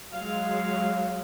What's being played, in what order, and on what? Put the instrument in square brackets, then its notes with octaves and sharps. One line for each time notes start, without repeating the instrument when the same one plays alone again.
[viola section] F#3 G#3 [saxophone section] F5